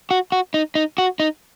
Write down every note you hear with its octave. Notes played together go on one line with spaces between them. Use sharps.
F#4
F#4
D#4
D#4
F#4
D#4